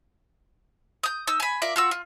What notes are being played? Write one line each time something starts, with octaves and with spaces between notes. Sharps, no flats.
D#6 G6
D#4 E6
G#5 B5
F4 A#4 D5 E5
F4 F#4 E6
F4